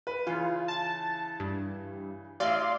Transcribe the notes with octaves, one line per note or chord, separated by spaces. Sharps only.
B4
C#3 E3 F4
A5
G2
A1 D5 E5 F5 C6